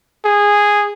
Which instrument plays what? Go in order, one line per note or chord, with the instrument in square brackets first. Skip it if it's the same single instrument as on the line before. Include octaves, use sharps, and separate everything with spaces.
[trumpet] G#4